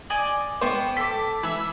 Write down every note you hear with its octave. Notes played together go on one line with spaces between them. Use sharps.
D5 D#5 G#5
B3 C5 G5 C#6
A4 D6 B6
E3 E5 B5 E6